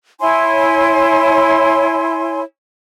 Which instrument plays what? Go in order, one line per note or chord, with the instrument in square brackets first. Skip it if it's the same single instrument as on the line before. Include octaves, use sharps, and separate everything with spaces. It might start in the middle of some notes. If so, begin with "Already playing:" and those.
[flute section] E4 C#5 G#5 C6